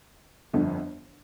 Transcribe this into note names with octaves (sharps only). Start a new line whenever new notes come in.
G1 F2 D3